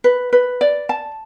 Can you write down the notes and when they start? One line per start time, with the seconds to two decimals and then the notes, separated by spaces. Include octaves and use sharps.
0.04 B4
0.33 B4
0.61 D5
0.89 A5